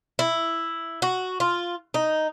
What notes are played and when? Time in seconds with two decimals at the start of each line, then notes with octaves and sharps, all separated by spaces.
0.19 E4
1.02 F#4
1.40 F4
1.94 D#4